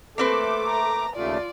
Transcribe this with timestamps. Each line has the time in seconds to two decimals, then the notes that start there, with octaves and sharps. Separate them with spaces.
0.18 A3 A#3 C4 A4 B4 D6
0.68 A#5
1.16 D#2 C#3 A3 F4 D5